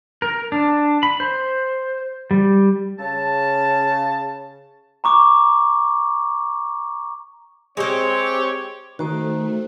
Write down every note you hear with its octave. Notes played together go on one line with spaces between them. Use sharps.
A#4
D4
B5
C5
G3
C#3 A5
A#5 C#6 D6
G#3 C4 G4 C5 C#5
D#3 A3 F#4 C5